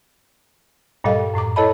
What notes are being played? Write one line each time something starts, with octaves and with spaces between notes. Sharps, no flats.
G2 A#2 G3 A4 D#5 F5
F#2 A2 A#5 D6
E4 A4 C#5 D#5 A5 B5